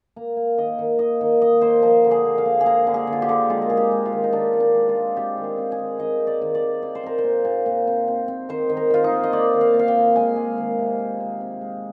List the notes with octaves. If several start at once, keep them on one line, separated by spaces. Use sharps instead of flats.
A#3 A#5
A#3
D#3 D#5
D#3
A#3 D#5
D#3
A#3 D#5
A#3 C5
F3 A#4
D3
G#4
A#3
F5
A#3
G#4
A#3 A#4
D3
G#4
D3
F4
G4
D3
G#3 F4
A#4
C4 G#4
G4
G#3
F4
D#3
D#4
D#3 D4
D#3
D4
G#3
F4
G#3
C4 G4
D#3
G#4
C4
G#4
D#3
D#3 D#5
C4
D5
D#3
D5
D#3
C4 D5
C5
C4 A#4
C5
A#2
A#2
A#2
C4
C4
C4
D#3 C5
D#3
A#4
D#3 F4
D#4
A#3
D#5
A#3 D5
D#3
F5
A#3
F5
G5
D#3
G#3 G#5
G#3
D#3
C3
C4
C4
C4
G#3